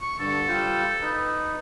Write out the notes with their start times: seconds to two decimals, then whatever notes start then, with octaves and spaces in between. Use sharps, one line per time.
0.01 C#6
0.19 G2 D3 A4
0.48 G3 F4 C5
1.02 D#4 B4